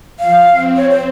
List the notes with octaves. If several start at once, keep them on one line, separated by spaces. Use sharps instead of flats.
F3 F5
C4
C#5
C5